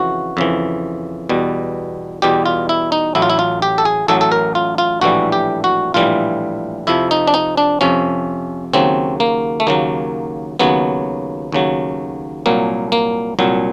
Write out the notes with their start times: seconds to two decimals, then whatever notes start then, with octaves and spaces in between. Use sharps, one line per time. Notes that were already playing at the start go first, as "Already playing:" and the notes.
Already playing: F2 C#3 E3 F#4
0.37 F2 C#3 E3
1.29 E2 B2 G3
2.22 E2 B2 G3 G4
2.46 F4
2.69 E4
2.92 D#4
3.15 A1 A2 F#3 E4
3.22 F4
3.30 E4
3.39 F4
3.62 G4
3.78 A4
3.85 G#4
4.08 A1 A2 F#3 A4
4.21 A4
4.32 A#4
4.55 F4
4.78 F4
5.01 A#1 A2 E3 G3 F#4
5.32 G4
5.64 F#4
5.94 A#1 A2 E3 G3 F4
6.87 F2 C3 F3 E4
7.11 D#4
7.28 D4
7.34 D#4
7.57 D4
7.81 F2 C3 F3 C#4
8.73 D#2 C#3 F#3 C4
9.20 A#3
9.60 A3
9.67 D#2 C#3 F#3 A#3
10.59 D#2 C#3 F#3 B3
11.52 D#2 C#3 F#3
12.46 C2 A#2 F#3 A#3
12.92 A#3
13.39 C2 A#2 F#3